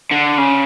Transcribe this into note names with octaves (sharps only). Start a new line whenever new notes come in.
D3
C#3